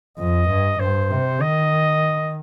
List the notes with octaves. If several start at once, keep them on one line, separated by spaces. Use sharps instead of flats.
F2 D#5
G2
G2 C5
C3
D#3 D#5